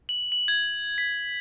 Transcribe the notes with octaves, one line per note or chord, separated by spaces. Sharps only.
F#7
F#7
G#6
B6